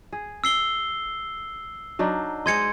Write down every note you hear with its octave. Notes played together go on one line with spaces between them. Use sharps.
G#4
E6 C7 G7
F#3 D4 D#4
G#3 C5 D#5 C6 G#6 C#7